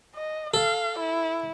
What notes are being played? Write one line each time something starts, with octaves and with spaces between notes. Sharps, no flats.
D#5
A4 F5
E4